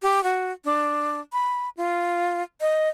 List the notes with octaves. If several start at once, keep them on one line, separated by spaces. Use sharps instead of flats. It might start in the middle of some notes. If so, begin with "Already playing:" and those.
G4
F#4
D4
B5
F4
D#5